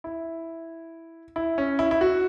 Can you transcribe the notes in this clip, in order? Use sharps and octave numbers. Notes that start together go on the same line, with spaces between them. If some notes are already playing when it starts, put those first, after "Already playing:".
E4
E4
C#4
E4
E4
F#4